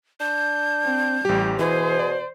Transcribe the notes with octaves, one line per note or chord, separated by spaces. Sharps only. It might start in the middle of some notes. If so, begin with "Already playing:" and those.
D4 G6
C4
A1 G3 G4
B2 E3 G#4 C5
D5